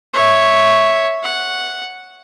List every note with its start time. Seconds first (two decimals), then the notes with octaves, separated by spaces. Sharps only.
0.13 C#5 E5
1.23 F#5